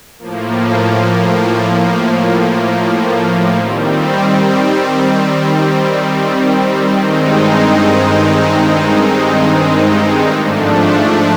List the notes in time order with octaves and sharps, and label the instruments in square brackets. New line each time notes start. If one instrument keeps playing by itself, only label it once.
[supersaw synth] A2 F3 A#3
D#3 G3 C4
G2 D#3 G#3 C4 D#4
G#2 F3 A3 D4